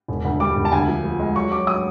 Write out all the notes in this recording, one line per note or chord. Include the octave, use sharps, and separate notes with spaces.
E1
D2
G3 D6
E1
A5
D2 G#5
F3
F3
G#3
F#3 C#6
F#3 D6
D#6